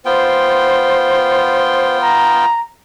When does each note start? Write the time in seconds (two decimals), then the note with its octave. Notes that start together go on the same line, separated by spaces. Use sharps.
0.05 B3 F4 C5 G5
2.01 A#5